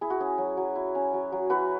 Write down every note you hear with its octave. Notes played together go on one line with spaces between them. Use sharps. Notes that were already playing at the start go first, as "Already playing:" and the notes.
E4 G#4
F#4
C#4 G#4
F#3
F#3
E4
C#4
F#3
F#3
E4 F#4 B4